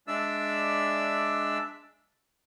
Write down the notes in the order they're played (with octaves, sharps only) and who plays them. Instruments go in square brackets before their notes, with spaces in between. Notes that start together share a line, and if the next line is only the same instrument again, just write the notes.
[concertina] G#3 D4 D5 E5 E6